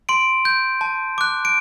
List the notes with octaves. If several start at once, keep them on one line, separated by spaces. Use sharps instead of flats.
C6 D7
G6
A5
D6 F#6
D7